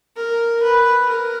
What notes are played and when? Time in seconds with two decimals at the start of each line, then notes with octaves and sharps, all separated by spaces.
0.16 A#4
0.62 B4
1.09 A#4